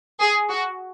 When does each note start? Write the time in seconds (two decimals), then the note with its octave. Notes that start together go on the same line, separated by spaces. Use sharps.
0.20 G#4
0.49 F#4